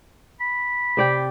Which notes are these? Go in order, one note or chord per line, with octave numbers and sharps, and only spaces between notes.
B5
C3 D5 G5